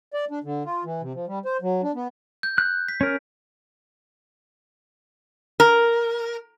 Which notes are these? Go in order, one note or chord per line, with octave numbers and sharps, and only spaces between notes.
D5
D4
D3
F4
E3
C3
F3
G3
C5
F#3
D4
B3
G6
F#6 G6
B6
C#4 A#4
A#4